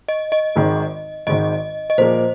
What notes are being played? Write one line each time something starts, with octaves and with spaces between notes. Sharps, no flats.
D#5
D#5
G#1 G#2 D#3
G#1 G#2 D#3 D#5
D#5
A#2 F3 A#3 G#4 C5